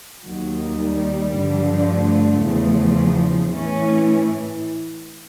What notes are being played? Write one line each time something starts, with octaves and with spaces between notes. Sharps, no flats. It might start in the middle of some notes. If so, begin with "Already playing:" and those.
D#2 D#3 F#3
G3
G2 D3 F3
A3
E2 C#3 F3
A2 E3 C#4